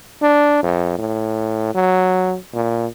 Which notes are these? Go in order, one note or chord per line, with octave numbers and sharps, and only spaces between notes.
D4
F2
A2
F#3
A#2